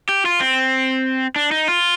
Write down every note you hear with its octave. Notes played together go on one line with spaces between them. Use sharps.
G4
F4
C4
D4
D#4
F4